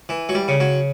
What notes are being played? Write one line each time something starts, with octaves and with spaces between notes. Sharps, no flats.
E3
F#3
G3
C#3
F#3